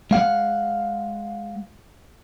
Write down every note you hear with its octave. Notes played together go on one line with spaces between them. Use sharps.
G#3 F5 F#5